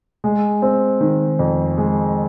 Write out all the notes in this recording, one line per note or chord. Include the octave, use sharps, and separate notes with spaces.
G#3
C4
D#3
F2
G#3